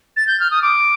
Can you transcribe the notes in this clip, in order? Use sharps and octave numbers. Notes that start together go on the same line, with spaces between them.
A6
G6
F6
D#6
D6